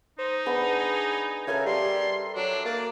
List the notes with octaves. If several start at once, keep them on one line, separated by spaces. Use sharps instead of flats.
D#4 C5
B3 D4 G#4
C#3 A4 A#4 E5 G#5
G3 C6
F#3 D4
A#3 D5